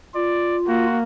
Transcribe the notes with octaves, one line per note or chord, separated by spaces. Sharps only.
F4 D5
A#3 F#4